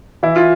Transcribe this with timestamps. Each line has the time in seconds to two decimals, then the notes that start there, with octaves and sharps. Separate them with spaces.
0.23 E3 E4
0.36 F4